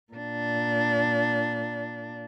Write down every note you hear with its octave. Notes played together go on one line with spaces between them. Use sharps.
A#2 D4